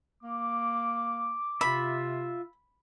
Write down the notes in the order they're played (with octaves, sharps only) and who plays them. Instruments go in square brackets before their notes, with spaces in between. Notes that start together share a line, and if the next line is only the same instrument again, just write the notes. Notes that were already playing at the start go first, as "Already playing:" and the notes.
[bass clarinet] A#3 [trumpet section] D6
[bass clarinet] C3 [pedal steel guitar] F4 E5 [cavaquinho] B5